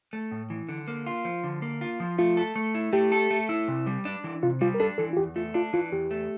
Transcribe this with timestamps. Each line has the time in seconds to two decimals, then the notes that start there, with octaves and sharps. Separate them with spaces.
0.13 A3
0.32 A2
0.50 E3
0.69 D3
0.88 A#3
1.06 F4
1.25 F3
1.44 D3
1.62 A#3
1.81 F4
2.00 F3
2.18 A3 F4
2.37 A4
2.56 A3
2.75 E4
2.93 A3 G4
3.12 A4
3.31 A3
3.49 E4
3.68 C3
3.87 G3
4.05 D4
4.24 E3
4.43 C3 F4
4.61 G3 F4
4.74 A#4
4.80 D4 A4
4.98 E3 A4
5.13 F4
5.17 E2 G4
5.36 A3 F4
5.54 D4 F4
5.73 E3 F4
5.92 E2 G4
6.11 A3